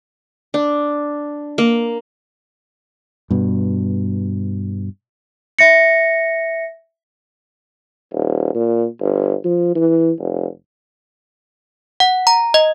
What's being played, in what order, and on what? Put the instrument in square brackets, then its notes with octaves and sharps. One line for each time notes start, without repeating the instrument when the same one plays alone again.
[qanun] D4
A#3
[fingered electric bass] G2 B2
[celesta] E5 A#6 C#7
[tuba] D#1
A#2
G1
F3
E3
F1
[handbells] F#5
A#5
D#5